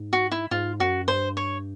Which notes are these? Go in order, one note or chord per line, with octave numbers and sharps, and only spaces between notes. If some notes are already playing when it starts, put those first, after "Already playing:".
Already playing: G#2
F#4
E4
G#2 F4
F#2 F#4
G2 C5
C#5